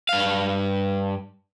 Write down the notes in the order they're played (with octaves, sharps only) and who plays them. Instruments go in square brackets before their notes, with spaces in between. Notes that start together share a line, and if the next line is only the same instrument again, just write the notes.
[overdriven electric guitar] G2 F5